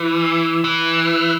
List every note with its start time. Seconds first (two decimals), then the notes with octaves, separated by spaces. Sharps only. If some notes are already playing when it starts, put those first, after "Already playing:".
Already playing: E3
0.64 E3